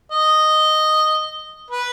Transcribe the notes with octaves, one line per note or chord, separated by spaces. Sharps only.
D#5
B4